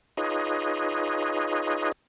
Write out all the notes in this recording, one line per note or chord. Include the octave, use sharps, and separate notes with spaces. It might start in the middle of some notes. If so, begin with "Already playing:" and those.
D#4 F4 G#4 B4 C#5 D#5